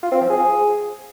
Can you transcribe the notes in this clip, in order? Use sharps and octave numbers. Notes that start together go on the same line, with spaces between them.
F4
C4
F3
G#4